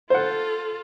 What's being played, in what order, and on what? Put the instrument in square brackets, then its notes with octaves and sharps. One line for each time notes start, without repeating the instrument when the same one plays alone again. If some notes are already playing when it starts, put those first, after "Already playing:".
[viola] F4 A4 [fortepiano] C5 F#5